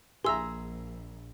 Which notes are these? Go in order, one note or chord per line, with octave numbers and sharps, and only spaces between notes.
A#1 G#4 E5 A#5 C6 E6